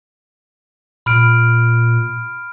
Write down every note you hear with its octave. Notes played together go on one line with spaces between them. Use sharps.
A#2 B5 F6 D7